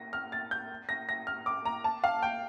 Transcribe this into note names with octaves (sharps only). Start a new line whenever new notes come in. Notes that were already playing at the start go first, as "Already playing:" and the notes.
Already playing: A#6
F6
A6
G6
A#6
A#6
F6
D6
A#5
A5
F5
G5